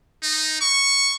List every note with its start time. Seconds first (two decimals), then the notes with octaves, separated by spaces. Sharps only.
0.23 D#4
0.61 C#6